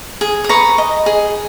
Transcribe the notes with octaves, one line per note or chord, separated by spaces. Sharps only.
G#4
D#6
B4 A#5 C#6
D#5
G#4